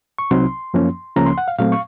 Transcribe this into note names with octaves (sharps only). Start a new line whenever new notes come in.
C#6
C2 C3 F#3 C4 D#4 C6
F#2 F3 A#3 C#4
C#2 C#3 F3 A#3 C#4 A#5
C6
F#5
F5
A#2 F#3 A3 C4 F5
C#6